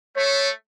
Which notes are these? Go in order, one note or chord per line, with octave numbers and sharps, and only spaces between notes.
A3 C#5